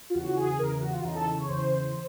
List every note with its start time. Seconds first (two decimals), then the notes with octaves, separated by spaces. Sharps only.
0.10 F4
0.14 E2 C#3 E3 F#4
0.37 G#4
0.58 E2 C#3 E3 A#4
0.81 F#4
0.92 F4
1.03 E2 C#3 E3 D#4
1.15 A4
1.37 C#5
1.49 E2 C#3 E3 C5